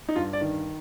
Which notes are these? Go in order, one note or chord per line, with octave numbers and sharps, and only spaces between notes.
D#4
G2 F4
D5
D#3